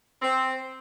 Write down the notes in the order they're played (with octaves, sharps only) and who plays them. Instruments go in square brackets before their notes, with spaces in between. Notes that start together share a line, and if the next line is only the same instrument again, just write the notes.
[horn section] C4